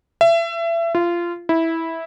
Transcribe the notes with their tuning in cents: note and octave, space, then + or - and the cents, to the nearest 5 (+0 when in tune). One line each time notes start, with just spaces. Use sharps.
E5 +30
F4 -20
E4 -10